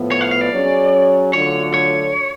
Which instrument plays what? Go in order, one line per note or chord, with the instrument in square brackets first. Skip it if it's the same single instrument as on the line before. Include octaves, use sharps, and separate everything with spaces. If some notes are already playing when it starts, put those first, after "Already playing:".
Already playing: [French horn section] A2 F3 B3
[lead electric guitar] C#5
F5
F5
D5
[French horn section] F#3 C#4 G#4 C#5
[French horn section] D3 F#3 A3 D4 F4 [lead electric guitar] C#5
[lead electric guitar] C#5